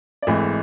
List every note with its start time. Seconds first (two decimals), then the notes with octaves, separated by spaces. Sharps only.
0.22 D5
0.27 G#1 G#2 E3 A3 D#5